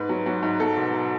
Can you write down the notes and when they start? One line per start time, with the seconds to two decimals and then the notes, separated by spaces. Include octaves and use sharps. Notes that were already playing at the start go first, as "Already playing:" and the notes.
Already playing: G#2 B4
0.09 F#3
0.26 F#3
0.43 G#2
0.60 F#3 A4
0.77 B2